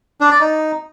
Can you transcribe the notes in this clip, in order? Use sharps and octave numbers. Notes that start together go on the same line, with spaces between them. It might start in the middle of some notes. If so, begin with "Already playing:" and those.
D4
D5
D#4